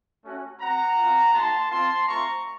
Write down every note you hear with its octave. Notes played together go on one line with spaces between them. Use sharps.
A3 C#4 F#4
C4 F#4 F#5 A#5
C4 F4
A#3 D#4 F#4 A5 C6
C4 F4 A5 C6
A3 C4 F4 A#5 C#6